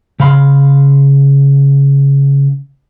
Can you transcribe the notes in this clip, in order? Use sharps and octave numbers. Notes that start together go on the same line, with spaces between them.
C#3 F5 B5 C6